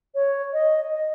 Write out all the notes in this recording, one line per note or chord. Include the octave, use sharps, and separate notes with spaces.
C#5
D#5
D#5